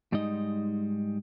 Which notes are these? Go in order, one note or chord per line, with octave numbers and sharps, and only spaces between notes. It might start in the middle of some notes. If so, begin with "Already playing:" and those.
G#2 G3 G#3 D#4 D#5